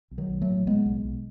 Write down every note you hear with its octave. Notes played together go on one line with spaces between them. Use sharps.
B1
D#3 F#3
B1
F#3 A3
A2
A2 G#3 B3
B1
B1